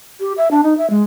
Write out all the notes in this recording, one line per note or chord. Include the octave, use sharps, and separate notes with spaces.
G4
E5
D4
D#4
E5
G#3